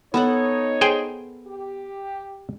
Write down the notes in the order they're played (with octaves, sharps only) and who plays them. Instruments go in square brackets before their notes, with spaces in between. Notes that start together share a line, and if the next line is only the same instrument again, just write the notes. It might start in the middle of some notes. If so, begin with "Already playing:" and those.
[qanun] B3 A4 F#5 [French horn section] D#4 C#5
[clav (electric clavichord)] G#4 C5 G5
[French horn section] G4